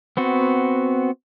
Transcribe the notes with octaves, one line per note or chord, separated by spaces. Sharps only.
B3 C4 F#4